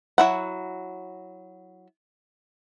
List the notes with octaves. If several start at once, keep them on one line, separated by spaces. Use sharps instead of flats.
F#3 E4 F#5